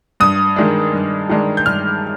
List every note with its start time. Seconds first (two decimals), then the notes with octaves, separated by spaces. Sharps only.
0.20 G2 D#6
0.56 D#3 G#3 D4
0.93 G2
1.29 D#3 G#3 D4
1.57 G6
1.65 G2 F6